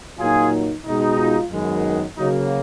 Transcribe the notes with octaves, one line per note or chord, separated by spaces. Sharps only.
A#2 F#3 A#3 D#4 F4 G#4
B2 G#3 D#4
F4
F#2 D#3 G#3 B3
C#3 F#3 A#3 D#4